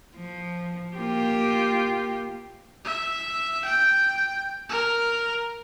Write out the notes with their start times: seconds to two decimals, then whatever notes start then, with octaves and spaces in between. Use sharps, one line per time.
0.16 F3
0.97 A#3 F4 G4
2.84 E5
3.65 G5
4.69 A#4